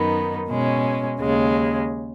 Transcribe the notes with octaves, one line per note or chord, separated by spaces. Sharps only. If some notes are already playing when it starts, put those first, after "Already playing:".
Already playing: F#2 D#3 B3 D#4
B2 G#3 C#4
D#2 C#3 G#3